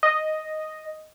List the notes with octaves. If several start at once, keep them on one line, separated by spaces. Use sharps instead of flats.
D#5